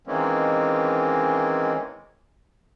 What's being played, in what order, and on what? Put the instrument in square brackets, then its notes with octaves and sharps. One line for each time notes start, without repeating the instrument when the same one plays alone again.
[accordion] D#3 E3 G#3 A#3 C4 C#4